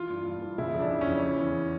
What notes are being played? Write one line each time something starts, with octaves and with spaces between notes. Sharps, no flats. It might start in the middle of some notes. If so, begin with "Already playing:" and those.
Already playing: E3 F4
G2
G2
E3
C#3 E4
F2
D4
E3
C#4
F2
E3
E2